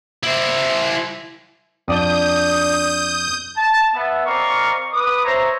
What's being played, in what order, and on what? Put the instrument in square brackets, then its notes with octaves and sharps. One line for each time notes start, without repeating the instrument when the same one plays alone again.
[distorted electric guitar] E4 C5
[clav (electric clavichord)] F2 D5 A5 [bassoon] D4 [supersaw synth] D#6 G6
[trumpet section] A5
B3 E5
C4 A#4 D5 D#5 F5 C#6
B4 D6 D#6
C5 C#5 E5 A#5